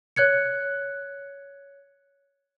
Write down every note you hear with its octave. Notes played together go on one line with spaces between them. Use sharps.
C#5 F#6 G#6 C#7